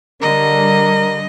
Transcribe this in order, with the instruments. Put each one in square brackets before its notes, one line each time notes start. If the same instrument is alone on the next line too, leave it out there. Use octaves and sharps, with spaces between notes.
[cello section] D3 G3 [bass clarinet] A#4 [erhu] D#5